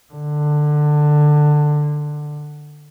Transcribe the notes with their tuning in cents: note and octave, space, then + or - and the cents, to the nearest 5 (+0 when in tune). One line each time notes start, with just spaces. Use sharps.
D3 +15